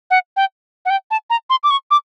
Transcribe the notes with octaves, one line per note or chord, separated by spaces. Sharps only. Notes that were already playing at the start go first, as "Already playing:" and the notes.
F#5
G5
F#5
G5
A5
A#5
C6
D6
C#6
D6